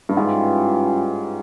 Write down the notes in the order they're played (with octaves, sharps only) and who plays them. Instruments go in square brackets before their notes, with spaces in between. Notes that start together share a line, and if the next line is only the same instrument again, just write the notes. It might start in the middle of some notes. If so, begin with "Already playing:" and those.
[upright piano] G2
[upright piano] G#2 [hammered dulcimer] E3 G3 C#4 F4